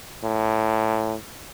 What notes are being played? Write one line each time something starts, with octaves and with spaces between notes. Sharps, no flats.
A2